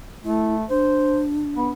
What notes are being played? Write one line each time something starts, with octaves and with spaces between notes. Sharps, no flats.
A3 E4
D4 C5
B3